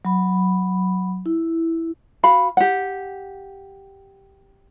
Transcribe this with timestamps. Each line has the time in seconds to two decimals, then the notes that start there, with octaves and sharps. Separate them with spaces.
0.05 F#3 B5
1.26 E4
2.23 F#4 F5 B5
2.57 G4 F#5